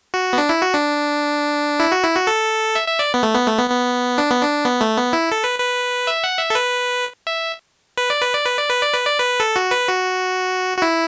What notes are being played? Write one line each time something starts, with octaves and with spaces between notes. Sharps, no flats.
F#4
B3
D4
E4
F#4
D4
E4
F#4
E4
F#4
A4
E5
E5
D5
B3
A3
B3
A3
B3
B3
D4
B3
D4
B3
A3
B3
E4
A4
B4
B4
E5
F#5
E5
A4
B4
E5
B4
D5
B4
D5
B4
D5
B4
D5
B4
D5
B4
A4
F#4
B4
F#4
F#4
E4